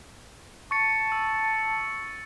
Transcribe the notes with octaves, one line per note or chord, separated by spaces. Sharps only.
A5 C#6 A6 C#7
E6